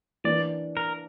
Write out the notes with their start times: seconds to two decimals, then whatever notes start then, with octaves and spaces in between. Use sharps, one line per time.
0.24 E3 A#3 D4 D5
0.77 A#4